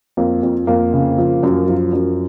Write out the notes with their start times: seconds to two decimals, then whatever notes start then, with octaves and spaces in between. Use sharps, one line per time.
0.17 F2 A#3
0.43 F2
0.67 F2 A#3
0.94 C#3
1.18 F3
1.43 F#2
1.68 F3
1.93 F#2